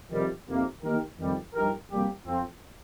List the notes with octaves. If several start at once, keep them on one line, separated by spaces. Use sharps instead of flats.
F2 C3 D#3 G3
F2 C3 D#3 A#3
D#3 A#3 D#4 G4 A#4
F2 D#3 G3
G2 F3 D#4 G4 A#4
F2 C3 G3 A#3 G4
F2 F3 C4